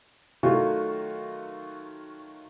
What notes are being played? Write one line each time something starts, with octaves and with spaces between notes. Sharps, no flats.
D#3 F#3 A3 F4 F#4